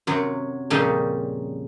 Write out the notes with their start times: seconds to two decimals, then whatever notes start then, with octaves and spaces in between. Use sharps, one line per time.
0.07 F#2 C3 F#3
0.70 F2 A#2 C#3 G3 C#4 D#4